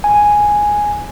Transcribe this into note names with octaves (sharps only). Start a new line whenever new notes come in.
G#5